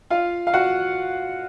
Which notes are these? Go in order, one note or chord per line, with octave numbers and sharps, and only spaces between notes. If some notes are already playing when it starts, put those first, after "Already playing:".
F4 F5
F5
F#4 F#5